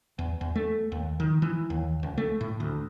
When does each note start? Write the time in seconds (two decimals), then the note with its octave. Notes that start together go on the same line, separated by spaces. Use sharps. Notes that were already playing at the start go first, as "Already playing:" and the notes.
0.19 E2
0.41 E2
0.56 A3
0.92 D#2
1.20 D#3
1.42 E3
1.70 D#2
2.03 C#2
2.18 A3
2.41 A2
2.60 D2